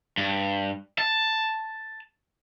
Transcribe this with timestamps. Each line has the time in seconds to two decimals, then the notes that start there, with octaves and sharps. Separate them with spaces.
0.17 G2
0.98 A5